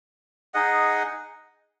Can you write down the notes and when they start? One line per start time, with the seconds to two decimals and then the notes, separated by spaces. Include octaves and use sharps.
0.54 D#4 G#4 D#5 F#5